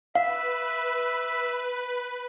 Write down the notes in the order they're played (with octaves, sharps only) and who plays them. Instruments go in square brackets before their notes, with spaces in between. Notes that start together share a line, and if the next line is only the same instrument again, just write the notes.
[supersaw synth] B4 [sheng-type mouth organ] E5 [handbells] F5